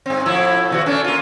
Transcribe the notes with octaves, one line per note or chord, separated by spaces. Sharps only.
G2 C4
A2 F3 E4
B2 E3 F#4
A3 C#4 D4
A#3 F4